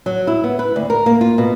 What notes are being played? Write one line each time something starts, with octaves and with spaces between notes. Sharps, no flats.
F#3
E4
B3
B4
D2
A#4
A#3
F4
B2